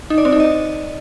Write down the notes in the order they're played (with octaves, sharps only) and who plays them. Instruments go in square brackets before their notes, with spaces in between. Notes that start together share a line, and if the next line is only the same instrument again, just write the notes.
[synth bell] D#4
D5
C4
D#4
D#5